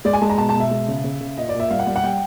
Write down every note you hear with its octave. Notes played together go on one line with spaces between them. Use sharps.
G#3 D5
G#5
G#3 A5
A#5
B2 A5
A5
B2
E5
G#3
C#3
C#3
C#3
A#2 D#5
D5
A#2
E5
G3 F5
F#5
G3
F#5
G3 G5